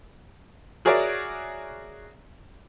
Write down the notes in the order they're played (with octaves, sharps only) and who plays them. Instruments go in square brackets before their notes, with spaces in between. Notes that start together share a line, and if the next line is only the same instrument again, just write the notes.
[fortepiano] F#4 G#4 A#4 C#5 D5 E5